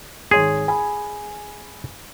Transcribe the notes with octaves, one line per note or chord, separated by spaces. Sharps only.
G#1 G#4 C#5 C6
G#5 B5